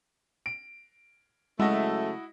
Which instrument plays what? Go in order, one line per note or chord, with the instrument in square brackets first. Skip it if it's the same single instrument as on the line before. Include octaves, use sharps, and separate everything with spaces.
[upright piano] D7
[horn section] C#3 F#3 A3 [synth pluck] G#3 [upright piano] E4 F#4 D#5